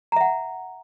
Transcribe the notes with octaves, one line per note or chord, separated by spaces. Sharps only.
E5 F#5 A#5